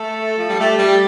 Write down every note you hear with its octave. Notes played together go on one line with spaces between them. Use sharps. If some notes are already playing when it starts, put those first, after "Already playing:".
Already playing: A3 A4
F3
G3
A3 G4
G3
G4